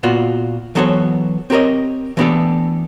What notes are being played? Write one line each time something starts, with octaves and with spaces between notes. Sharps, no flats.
A#2 B3 F4 F#4
E3 F#3 B3 A4 C5 C#5
C4 G4 A#4 C#5 D#5
E3 A3 B3 D4 G4 A4